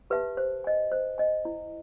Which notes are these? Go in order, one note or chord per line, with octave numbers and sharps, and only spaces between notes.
G4 B4 E5 A5
C5
D#5 G#5
C5
D#5 G#5
E4